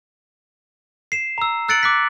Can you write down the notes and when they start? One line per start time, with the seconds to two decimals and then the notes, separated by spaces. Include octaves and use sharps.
1.12 C7 E7
1.38 A#5 E6
1.68 E6 F#6 A6 C#7 D7 F#7
1.83 D6 F#6 B6